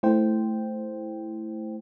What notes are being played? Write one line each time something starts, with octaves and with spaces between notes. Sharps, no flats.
A3 E4 C5 G5